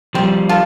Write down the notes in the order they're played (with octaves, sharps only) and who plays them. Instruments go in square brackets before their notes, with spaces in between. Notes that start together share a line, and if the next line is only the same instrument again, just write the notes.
[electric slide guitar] F3 G3 [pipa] C4
[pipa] F4 A4